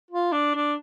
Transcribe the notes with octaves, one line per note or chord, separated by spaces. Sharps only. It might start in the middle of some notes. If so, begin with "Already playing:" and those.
F4
D4
D4